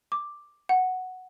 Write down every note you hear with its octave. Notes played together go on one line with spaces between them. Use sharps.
D6
F#5